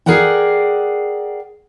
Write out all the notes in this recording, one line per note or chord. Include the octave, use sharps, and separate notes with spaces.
G#4 A#4 D5 F#5 G5